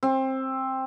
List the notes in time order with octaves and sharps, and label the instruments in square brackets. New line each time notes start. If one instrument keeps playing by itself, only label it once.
[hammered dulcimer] C4